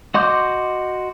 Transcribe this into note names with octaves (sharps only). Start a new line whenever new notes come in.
F#4 D#5 C6 D6 G6